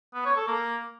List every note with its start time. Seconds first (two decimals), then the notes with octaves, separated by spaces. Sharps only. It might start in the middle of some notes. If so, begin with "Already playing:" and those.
0.14 B3
0.25 C#5
0.36 A4
0.47 A#3